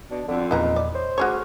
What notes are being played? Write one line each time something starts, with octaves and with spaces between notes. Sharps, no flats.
B2 D4
F2 D3
E2 A#2 C#3 E3 D#4 A#5 B5
D5
C5 C#5 D#5
D2 F#4 G#4 C#5 C#6 D6 F6